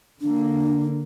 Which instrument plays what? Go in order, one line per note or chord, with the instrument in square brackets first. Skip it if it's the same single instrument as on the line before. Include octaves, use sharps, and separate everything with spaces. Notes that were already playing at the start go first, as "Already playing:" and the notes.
[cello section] D3 A#3 [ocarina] D4